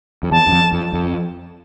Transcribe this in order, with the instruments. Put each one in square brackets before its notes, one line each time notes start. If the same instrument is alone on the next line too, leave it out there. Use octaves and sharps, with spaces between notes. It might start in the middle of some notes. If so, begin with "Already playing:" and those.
[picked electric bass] F2
[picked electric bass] E2 [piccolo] A5
[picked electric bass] F#2
F2
F2
F2